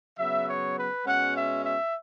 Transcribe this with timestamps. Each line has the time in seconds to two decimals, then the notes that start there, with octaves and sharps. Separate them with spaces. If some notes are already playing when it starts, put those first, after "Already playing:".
0.18 C#3 F#3 B3 E5
0.48 C#5
0.77 B4
1.05 B2 G#3 C#4 F#5
1.35 E5
1.64 E5